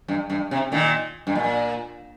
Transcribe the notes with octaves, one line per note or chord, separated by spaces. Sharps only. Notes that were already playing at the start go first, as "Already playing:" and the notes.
G2
G2
C3
A#2 D#3
G2
A#2